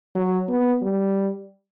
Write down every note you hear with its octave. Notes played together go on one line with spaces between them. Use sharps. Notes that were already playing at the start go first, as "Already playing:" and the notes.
F#3
B3
G3